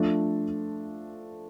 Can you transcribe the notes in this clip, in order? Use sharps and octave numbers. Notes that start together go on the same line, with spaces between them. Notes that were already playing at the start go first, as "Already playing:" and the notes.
Already playing: F3 A3 D4 A4